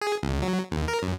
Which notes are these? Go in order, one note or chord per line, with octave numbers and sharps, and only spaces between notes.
G#4
C#2
F#3
D#2
A#4
F#2